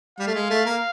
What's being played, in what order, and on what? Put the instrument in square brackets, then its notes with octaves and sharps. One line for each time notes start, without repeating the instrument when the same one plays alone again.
[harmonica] G3 [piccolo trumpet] F5
[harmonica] A3
G#3
A3
A#3